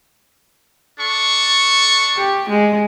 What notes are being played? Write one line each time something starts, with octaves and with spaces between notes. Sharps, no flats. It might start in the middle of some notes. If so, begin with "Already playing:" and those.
D4 A4 C#6
G4
G#3